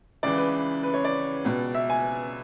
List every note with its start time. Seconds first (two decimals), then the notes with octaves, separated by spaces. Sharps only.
0.23 C#2 C#3 E3 D5
0.38 B4
0.83 B4
0.94 C#5
1.04 D5
1.45 C#2 B2
1.75 E5
1.90 G#5